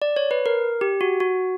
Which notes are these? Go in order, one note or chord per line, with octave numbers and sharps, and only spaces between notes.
D5
C#5
B4
A#4
G4
F#4
F#4